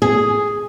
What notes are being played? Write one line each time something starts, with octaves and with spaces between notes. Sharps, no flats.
G#4